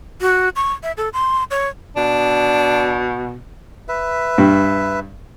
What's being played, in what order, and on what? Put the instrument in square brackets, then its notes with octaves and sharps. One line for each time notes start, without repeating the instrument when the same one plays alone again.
[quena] F#4
C#6
E5
A4
C6
C#5
[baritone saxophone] B2 [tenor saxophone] D4
[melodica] B4 E5
[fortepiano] G2